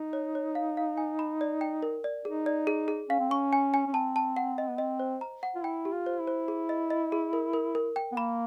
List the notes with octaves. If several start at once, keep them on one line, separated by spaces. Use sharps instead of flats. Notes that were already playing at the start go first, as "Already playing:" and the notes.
Already playing: D#4
C#5
C#5
F5
F5
G#5
B5
D5
G5
A#4
D5
D#4 G#4
D5
G#4
G#4
C#4 F5
C4
C#4 C#6
G#5
G#5
C#4
C4 A5
A5
F#5
D#5
B3
C4 D#5
C5
A#5
F#5
F4
E4 G5
G4
F4
C5
E4
C5
G#4
D#5
D#5
G#4
A#4
A#4
A#4
G5
B3
A#3 B5